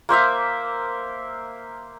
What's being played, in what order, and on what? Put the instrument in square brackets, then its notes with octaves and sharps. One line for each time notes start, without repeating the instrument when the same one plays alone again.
[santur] A#3 C5 E5 F5